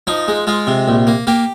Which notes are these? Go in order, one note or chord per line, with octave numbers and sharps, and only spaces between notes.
F3 D#4
G#3
G#3 F4
C3
A#1
A#3
A#3 G4